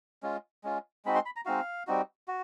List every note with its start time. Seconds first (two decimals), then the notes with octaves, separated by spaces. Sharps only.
0.23 G#3 C#4 F4
0.64 G#3 C#4 F4
1.05 G#3 C4 D#4 F#4 B5
1.15 C6
1.26 B5
1.36 A#5
1.46 G#3 C4 D#4 F#4 F5
1.87 G3 C4 D#4 F#4
2.28 F#4